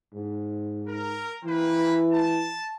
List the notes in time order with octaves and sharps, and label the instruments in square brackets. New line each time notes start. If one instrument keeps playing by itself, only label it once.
[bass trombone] G#2
[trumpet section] A#4
[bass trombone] E3 [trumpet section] A#3 C4 B4
[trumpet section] A5